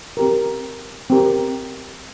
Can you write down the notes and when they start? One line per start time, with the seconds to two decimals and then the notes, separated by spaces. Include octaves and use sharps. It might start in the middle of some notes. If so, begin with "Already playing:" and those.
0.17 C4 G4 A#4
1.10 C4 G4 A#4